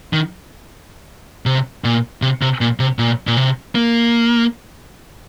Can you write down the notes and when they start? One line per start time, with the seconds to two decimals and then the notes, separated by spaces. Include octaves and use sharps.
0.13 D#3
1.46 C3
1.84 A#2
2.22 C3
2.42 C3
2.61 A#2
2.80 C3
2.99 A#2
3.27 A#2
3.37 C3
3.75 A#3